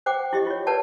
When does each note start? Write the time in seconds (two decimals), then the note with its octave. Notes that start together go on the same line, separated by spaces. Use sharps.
0.06 C5 F#5 G5 D6
0.33 E4 G4 D#5
0.47 F4 C#5
0.67 A#4 B4 C#5 D5 F#5 A5